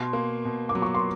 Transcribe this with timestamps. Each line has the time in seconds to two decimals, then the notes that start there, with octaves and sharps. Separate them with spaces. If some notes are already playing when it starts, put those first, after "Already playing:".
Already playing: B2 C6
0.13 A#3
0.45 B2
0.69 D6
0.75 F#3
0.82 C#6
0.94 C6